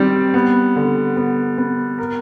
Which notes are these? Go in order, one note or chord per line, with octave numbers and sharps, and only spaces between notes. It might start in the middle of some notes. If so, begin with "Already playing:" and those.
Already playing: D#3 G3 C4
B3
D3
B3
B3
A#4